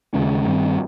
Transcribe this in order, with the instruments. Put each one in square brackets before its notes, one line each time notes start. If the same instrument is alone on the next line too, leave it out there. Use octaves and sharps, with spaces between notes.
[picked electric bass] D#2 C#3 G#3 C#4
G2 D#3 G3 C4